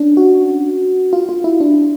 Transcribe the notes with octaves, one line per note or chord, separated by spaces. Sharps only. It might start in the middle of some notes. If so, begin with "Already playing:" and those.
Already playing: C#4 D4
F#4
F4
F4
E4
D4